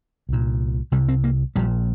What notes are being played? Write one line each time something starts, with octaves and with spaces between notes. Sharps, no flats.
C2 A#2
C2 C3 G3
C4
A#3
A#1 A#2 G3